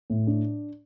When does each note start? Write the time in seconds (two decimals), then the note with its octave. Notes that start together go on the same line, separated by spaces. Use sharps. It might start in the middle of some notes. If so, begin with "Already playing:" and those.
0.10 A2
0.27 D4